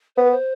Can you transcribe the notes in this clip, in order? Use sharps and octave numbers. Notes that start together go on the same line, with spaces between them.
B3 C5
B4
C5